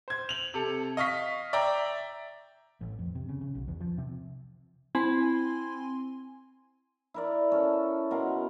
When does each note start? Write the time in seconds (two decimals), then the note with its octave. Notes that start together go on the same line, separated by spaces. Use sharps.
0.08 C5 G#6
0.29 F7 F#7
0.54 C3 A4
0.97 D#5 F5 C#6 B6
1.53 D5 E5 G5 A#5
2.81 A1
2.99 F2
3.15 C3
3.29 C#3
3.41 C#3
3.55 B1
3.68 E2
3.81 F3
3.98 C3
4.95 C4 E4 G#5 C6
7.14 E4 A#4 D5
7.52 C#4 A4
8.11 B2 A#4 F#5 C6